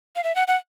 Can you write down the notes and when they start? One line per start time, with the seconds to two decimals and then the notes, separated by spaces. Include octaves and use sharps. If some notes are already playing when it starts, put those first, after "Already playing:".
0.16 F5
0.24 E5
0.36 F#5
0.48 F#5